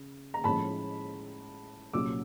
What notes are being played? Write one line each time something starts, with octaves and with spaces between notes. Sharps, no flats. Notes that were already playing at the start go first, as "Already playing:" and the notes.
Already playing: C#3
A#5
A2 F3 G#3 C#4 A5 B5
C2 A#2 F#3 A#3 C#4 D6 E6